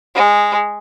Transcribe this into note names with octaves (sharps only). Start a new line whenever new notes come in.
G#3